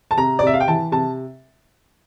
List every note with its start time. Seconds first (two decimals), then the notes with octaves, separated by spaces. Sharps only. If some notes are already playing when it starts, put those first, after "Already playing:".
0.11 A5
0.17 C3 A#5
0.39 D5
0.42 C3 E5
0.53 F5
0.60 G5
0.68 E3 A5
0.92 C3 A5